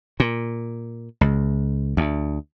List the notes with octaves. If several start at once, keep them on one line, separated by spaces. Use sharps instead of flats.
A#2
C#2
D2